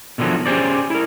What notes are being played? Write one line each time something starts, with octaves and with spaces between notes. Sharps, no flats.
B2 D3 D#3 F3 F#3 A3
C#4 G4 G#4 C5 D5
E4 A#4